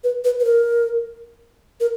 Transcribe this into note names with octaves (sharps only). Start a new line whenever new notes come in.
B4
B4
B4
A#4
A#4